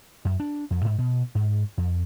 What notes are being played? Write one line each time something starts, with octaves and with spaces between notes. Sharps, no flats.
F#2
D4
F2
G#2
B2
G#2
F2